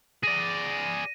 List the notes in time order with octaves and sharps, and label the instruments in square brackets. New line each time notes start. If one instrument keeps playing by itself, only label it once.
[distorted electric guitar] G#4 D5 [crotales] A#6 D#7